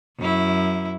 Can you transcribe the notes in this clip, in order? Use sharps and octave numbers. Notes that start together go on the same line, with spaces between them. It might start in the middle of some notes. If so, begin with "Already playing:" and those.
F#2 E4